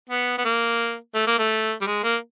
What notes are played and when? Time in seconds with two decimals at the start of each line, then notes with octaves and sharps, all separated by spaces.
0.09 B3
0.38 B3
0.45 A#3
1.15 A3
1.27 A#3
1.39 A3
1.81 G3
1.87 G#3
2.03 A#3